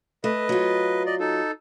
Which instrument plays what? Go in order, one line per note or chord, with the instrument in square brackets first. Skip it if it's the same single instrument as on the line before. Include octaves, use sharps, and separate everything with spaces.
[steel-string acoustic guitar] A3 [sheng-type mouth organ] B4 D#5
[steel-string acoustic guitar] F#3 F4
[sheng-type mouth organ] D5 D#5
D#4 A4